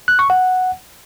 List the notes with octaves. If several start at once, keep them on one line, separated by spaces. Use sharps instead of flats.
F#6
C#6
F#5